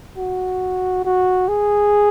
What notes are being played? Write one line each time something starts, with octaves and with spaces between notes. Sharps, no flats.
F#4
F#4
G#4